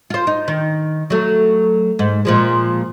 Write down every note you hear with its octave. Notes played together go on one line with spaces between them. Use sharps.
F4 C5
D#4
D#3
F#3 A3
G#2
A#2 F3 G#3